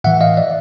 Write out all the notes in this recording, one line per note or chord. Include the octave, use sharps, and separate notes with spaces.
A2 E3 E5 F#5
D#5 F5
D5 E5